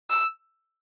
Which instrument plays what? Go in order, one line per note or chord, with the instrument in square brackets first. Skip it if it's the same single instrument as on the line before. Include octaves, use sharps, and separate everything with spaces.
[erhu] E6